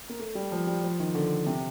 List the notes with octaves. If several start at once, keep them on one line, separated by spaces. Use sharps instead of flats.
A#3
A3
G3
F3
G3
F3
D#3
D3
C3